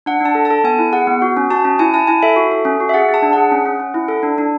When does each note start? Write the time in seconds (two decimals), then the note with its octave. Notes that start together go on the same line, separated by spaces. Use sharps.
0.06 D4 F#5
0.20 D4 A5
0.35 A4
0.45 A5
0.50 A4
0.64 B3 G#5
0.78 E4
0.92 G#4 F#5
1.07 B3
1.22 F#4
1.37 C#4
1.50 F#4 A5
1.65 C#4
1.79 E4 G#5
1.94 E4 A5
2.07 E4 G#5
2.22 A4 E5
2.36 F#4
2.51 A4
2.65 C#4
2.80 F#4
2.89 E5
2.93 G#4 F#5
3.09 G#4
3.14 A5
3.22 D4
3.33 G#4 F#5
3.51 C#4
3.65 C#4
3.80 C#4
3.94 E4
4.08 A4
4.23 D4
4.38 D4